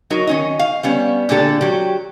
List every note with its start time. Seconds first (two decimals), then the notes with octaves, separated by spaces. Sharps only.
0.10 F#3 D#4 F#4 A#4
0.27 D#3 C#4 D#5
0.59 F5
0.83 G3 B3 C#4
1.29 A#2 D3 G#3 D4 G4 A4
1.61 F#3 G4